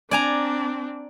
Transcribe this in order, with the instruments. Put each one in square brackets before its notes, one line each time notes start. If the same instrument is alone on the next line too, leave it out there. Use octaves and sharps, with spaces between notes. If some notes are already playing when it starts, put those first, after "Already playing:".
[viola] C4 D4 [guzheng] D5 G#5 A#5